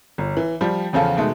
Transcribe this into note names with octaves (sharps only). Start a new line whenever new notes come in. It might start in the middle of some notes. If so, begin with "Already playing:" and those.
G1
E3
F3 G3
E2 C#3 F3 F4 A4
B2 D#3 G#3 A3